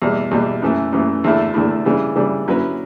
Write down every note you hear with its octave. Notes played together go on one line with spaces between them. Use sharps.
E2 B2 G3
E2 B2 G3
F#2 E3 A3
F#2 E3 A3
E2 D3 A3 E4
E2 D3 A3 E4
C#3 E3 G3 D4
C#3 E3 G3 D4
D3 F#3 C#4 E4 B4